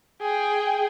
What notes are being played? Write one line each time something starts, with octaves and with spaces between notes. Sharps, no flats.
G#4 G5